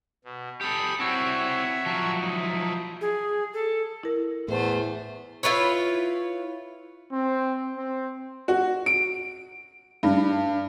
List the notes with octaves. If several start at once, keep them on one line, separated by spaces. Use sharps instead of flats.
B2
G4 A4 B5 D#6
C4 E4 F#4 C#5 E5
F3 F#3
D#4 E4
G#4
A4
E4 A#4
E2 A2 A3 C5
E4 F4 B4 C#5
C4
C4
F#4
D7
G2